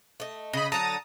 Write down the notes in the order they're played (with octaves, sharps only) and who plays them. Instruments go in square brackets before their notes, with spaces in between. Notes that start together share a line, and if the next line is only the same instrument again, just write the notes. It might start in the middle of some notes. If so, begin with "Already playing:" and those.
[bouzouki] A3 D#5
[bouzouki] C#3 [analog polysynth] D#5 B5
[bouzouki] D3 F#3 A4 [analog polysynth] A5 A#5 D#6